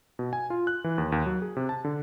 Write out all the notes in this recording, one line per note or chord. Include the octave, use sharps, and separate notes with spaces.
B2
G#5
F4
F#6
E3
D#2
D#2
F#3
G#4
C3
A5
D3